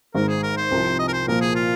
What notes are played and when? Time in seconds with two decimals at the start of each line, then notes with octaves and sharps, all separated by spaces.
0.15 G#1 G#2 G#3 A#4
0.28 G#4
0.43 A#4
0.57 C5
0.71 C2 C3 F3
0.99 D#5
1.08 A#4
1.13 C5
1.27 A#2 F3 A#3 A#4
1.42 G#4
1.55 F4